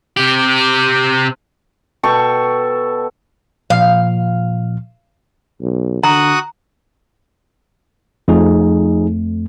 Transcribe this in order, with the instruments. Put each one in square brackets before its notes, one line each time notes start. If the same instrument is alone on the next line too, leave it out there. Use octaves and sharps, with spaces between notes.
[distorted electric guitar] C3 G4
[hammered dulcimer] B2 A4 G5 C#6
[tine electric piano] A#2 F3 [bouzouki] F5
[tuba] B1
[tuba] D3 [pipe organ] F#4 D#6 F#6 [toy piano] A#5
[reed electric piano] F2 A3 [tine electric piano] F3 D#4 G#4